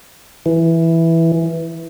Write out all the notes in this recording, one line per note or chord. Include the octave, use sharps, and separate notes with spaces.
E3